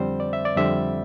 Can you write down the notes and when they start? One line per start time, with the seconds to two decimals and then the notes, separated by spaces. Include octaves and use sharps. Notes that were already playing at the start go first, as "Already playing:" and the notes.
Already playing: F2 D3 G3 C4 C5
0.20 D5
0.33 E5
0.45 D5
0.57 F2 D3 G3 C4 E5